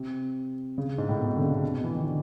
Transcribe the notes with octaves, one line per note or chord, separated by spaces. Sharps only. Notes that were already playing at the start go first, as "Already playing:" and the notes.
Already playing: C3
C#3
G#2
A2
B2
C3
D3
C#3
C3
B2
E3
D#3
D3